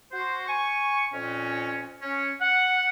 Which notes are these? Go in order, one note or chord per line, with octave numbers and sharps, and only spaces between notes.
F#4 C5
G#5 C#6
F2 A#2 C#4
C#4
F#5